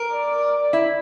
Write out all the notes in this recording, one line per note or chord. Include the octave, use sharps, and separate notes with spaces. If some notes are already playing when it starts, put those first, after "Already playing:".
Already playing: A#4
D5
E4